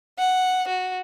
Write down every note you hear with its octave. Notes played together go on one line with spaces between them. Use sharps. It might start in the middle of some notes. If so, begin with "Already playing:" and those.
F#5
F#4